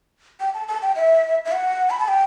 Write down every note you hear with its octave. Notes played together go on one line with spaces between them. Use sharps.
G5
A5
A5
G5
E5
E5
F#5
B5
A5
G5